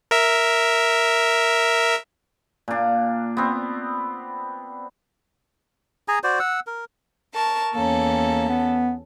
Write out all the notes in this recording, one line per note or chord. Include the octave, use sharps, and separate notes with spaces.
A#4 E5
A#2 D4
B3 C4
G#4 G#5 A#5
F#4 C5 D5
F#5 E6
A#4
A#4 A5 C#6
E2 A#3 C#4 A4
B3